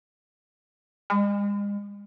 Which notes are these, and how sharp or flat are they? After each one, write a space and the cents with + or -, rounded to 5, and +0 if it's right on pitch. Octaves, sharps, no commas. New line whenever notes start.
G#3 -40